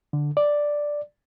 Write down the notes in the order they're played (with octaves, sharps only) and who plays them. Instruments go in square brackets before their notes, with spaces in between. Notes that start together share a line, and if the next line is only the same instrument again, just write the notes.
[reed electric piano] D3
D5